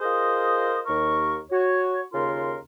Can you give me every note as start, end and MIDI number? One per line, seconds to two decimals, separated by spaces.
0.01 0.81 65
0.01 0.81 68
0.01 0.81 70
0.01 0.81 72
0.01 0.81 75
0.01 0.81 87
0.87 1.38 39
0.87 1.38 70
0.87 1.38 85
1.51 2.03 66
1.51 2.03 73
2.13 2.56 39
2.13 2.56 49
2.13 2.56 65
2.13 2.56 70
2.13 2.56 84